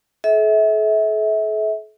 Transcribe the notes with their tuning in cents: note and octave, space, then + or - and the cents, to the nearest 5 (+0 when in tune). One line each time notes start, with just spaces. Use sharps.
A4 -45 E5 -30